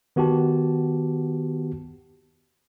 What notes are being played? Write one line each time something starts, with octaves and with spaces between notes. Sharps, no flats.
D#3 B3 F#4 G4 A5